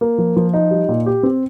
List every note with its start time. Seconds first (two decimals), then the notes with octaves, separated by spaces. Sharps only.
0.01 A#3
0.18 F3
0.36 F3
0.54 D#4
0.71 G3
0.89 A#2
1.06 G4
1.23 C4